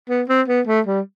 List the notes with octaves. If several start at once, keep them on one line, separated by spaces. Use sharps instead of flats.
B3
C4
B3
A3
G3